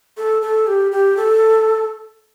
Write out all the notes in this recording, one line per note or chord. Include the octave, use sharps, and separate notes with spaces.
A4
A4
G4
G4
A4